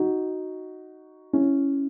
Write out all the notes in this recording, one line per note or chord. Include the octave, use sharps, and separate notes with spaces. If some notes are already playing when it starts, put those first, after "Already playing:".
Already playing: D#4 F#4
C#4 E4